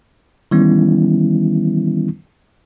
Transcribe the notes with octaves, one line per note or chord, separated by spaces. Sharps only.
D#3 E3 G3 B3 C#4 E4